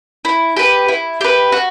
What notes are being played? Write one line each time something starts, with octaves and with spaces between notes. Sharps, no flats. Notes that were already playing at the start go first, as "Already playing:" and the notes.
E4
G4 B4
E4
G4 B4
F#4